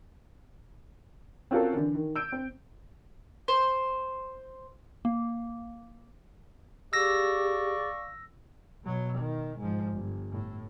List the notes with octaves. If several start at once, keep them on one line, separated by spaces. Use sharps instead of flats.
C4 C#4 F4 F#4 A4 A#4
D3 E3
D#3
E6 G6 D7
C4
C5
A#3
G4 G#4 D5 F5 C#6 E6 A#6
B2 F#3
D#3
G#2 F3
G1
A2